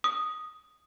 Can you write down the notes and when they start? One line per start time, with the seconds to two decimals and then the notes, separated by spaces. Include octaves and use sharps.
0.04 D#6